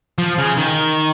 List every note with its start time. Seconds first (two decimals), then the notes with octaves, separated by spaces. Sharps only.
0.18 F3
0.38 C#3
0.58 D#3